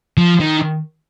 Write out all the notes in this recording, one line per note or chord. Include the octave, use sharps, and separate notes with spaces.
F3
D#3